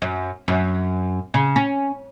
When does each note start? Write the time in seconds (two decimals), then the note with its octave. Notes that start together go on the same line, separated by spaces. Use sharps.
0.02 F#2
0.48 F#2
1.34 C#3
1.56 C#4